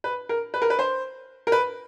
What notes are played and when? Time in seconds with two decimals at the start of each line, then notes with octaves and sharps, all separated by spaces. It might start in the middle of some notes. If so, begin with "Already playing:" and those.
0.04 B4
0.29 A#4
0.54 B4
0.62 A#4
0.70 B4
0.79 C5
1.47 A#4
1.52 B4